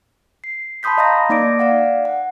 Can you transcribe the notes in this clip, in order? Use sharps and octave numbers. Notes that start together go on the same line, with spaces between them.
C7
A5 B5 C6 D#6 G6 B6
D#5 F5 A#5 D#6 G6 A#6
A#3 D#4 D5 D6 A#6 D7
D5 F5 F#5
F#5